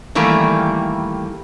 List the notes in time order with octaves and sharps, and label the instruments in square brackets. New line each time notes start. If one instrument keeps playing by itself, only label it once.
[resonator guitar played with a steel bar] D#3 E3 G3 A3 A#3